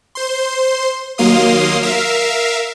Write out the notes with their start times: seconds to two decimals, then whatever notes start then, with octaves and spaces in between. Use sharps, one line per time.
0.15 C5 C6
1.18 D#2 F#3 A#3 F5 C6 D#6
1.83 A#4 E5 F5